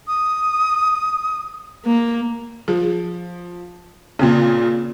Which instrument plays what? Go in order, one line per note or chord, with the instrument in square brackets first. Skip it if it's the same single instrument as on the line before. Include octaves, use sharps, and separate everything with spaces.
[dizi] D#6
[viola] A#3
[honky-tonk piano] F3 [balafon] G#4
[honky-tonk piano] A#2 C#3 [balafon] A#3 C4